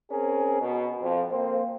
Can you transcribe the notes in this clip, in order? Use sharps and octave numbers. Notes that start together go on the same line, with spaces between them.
C4 C#4 G#4 A#4
B2
F2
A#3 C4 C5